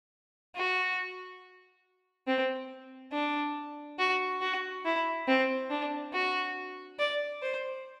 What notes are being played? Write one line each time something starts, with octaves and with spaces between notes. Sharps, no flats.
F#4
C4
D4
F#4
F#4
E4
C4
D4
F#4
D5
C5